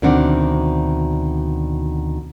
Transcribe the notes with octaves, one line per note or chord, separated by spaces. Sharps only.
D2 B2 D#3 C4 D4 F#5